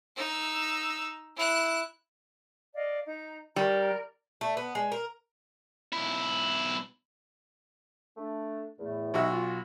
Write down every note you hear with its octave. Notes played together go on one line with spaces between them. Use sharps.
D#4 E6
E4 F#6
D5 D#5 F5
D#4 A#5
G3 A#4 A#5
A3
B3
G#3
A#4
B1 E4
A3 D4
E2 A2 A3
B1 D#4 F#4 E5 E6
F4